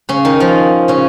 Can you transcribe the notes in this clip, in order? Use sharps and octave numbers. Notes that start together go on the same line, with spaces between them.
C#3 C#4
D#3 D#4
F3 F4
C#3 C#4